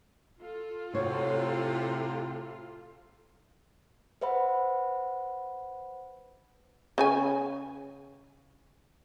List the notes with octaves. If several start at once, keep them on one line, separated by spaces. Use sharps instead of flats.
F4 A4
A2 C3 F#4 C#5
B4 C5 E5 F#5 B5
C#3 C#5 G#5